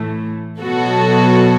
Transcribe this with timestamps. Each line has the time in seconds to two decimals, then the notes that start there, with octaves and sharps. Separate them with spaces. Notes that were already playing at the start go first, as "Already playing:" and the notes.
Already playing: A2 E3 A3
0.61 B2 F#3 B3 F#4 A4